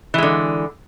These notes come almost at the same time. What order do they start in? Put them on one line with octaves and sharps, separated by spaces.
E3 G#3 D3